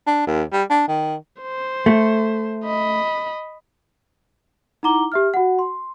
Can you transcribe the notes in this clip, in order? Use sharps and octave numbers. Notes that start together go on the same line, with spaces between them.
D4
D#2
G3
D4
D#3
C5
A3
D#5 B5
D#4 E4 F#5 A#5 D6 G7
G4 E5 F6
F#4 F#5
C6